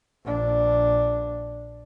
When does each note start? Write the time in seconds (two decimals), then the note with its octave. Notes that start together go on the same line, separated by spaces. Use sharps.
0.24 A#1 D4